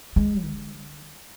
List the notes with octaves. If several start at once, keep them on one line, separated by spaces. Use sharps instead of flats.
G#3
D3